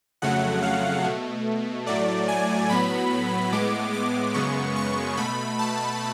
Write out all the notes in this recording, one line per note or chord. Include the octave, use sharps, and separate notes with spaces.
F2 C#3 F#3 A3 F#5
F5
B2 A3
A2 F#3 A3 D5
G#5
A2 F#3 B3 B5
A2 G#3 B3 D6
D6
F#2 C#3 G#3 B3 C#6
C#6
B2 A3 B5
A5